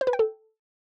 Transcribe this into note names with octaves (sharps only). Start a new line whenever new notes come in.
C5
B4
G5
A4